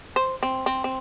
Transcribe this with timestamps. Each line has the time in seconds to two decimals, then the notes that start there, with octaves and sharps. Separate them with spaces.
0.16 C5
0.43 C4
0.66 C4
0.84 C4